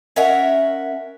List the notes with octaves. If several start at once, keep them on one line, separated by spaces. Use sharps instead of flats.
C#4 A#4 E5 F#5